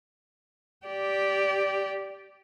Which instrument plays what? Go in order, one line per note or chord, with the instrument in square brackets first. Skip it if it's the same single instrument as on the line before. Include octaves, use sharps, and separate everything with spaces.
[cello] G4 D5